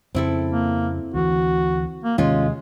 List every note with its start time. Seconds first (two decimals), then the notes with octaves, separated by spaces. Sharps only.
0.15 F2 C#3 C4 E4 A4
0.52 A#3
1.14 D2 E3 F#4
2.04 A#3
2.18 D#2 C3 D#3 G#3 C#4 F4